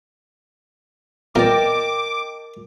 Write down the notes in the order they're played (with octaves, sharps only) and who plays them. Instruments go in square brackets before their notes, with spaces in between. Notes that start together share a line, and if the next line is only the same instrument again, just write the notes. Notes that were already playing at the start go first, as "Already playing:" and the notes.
[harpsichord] A#2 E3 C4 [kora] A#4 [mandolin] D#5 G5 A5 [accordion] D6